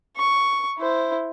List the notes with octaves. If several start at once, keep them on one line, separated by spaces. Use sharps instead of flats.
C#6
E4 C5